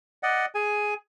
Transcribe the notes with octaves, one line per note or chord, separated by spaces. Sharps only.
D5 D#5 F#5
G#4 G#5